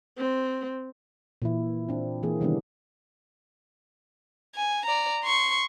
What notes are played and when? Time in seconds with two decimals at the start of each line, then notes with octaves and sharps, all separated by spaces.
0.18 C4
1.42 A#2 E3 E4
1.89 C4 D4
2.23 E3 A#3 G#4
2.40 C3 D#3 E3 G3 B3 D4
4.55 G#5
4.86 D5 A#5
5.24 C6 C#6